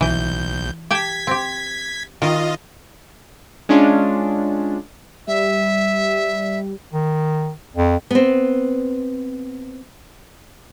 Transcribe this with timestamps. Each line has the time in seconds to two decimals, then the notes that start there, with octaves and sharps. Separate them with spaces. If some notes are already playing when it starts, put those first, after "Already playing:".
0.01 B1 E3 G6
0.91 G4 G5 A5 G#6 B6
1.27 C4 G4
2.22 D#3 F4 D#5
3.69 G#3 C#4 D4 F4
5.27 G3 E5
6.93 D#3
7.76 F2
8.11 B3 C4